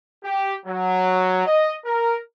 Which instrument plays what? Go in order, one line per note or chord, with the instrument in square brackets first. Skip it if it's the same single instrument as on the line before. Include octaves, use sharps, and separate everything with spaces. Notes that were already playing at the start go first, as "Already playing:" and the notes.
[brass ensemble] G4
F#3
D#5
A#4